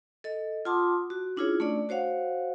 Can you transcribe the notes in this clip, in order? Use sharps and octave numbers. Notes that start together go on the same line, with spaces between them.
A4 D#5
F4 F#5 A5 C6 D6 D#6
F#4
C#4 D4 E4 F4 G#4 C#5
A3 C#4 D4 D5
F#4 C5 C#5 F5 F#5